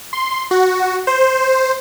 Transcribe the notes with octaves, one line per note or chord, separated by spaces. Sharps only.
C6
F#4
C5